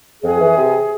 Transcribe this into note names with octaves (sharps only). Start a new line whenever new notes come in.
F2 G#4
E3
C3